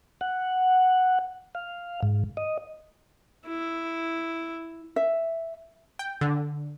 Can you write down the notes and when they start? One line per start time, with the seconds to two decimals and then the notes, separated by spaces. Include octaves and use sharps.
0.21 F#5
1.55 F5
2.03 G#2
2.37 D#5
3.47 E4
4.96 E5
5.99 G5
6.21 D3